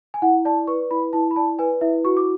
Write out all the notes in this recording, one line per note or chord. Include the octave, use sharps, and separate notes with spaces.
G#5
E4 F#5
D5 A5
B4 C#6
E4 B5
E4 A5
B5
D5 A5
B4 G#5
E4 E5
F#4 C#6
D6